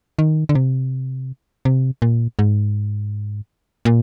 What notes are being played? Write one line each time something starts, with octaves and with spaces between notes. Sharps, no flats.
D#3
D3
C3
C3
A#2
G#2
A#2